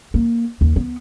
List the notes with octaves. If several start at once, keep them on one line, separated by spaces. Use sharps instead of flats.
A#3
D#2
B3